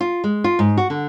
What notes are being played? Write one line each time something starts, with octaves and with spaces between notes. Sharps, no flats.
F4
G#3
F4
G#2
F#4
D3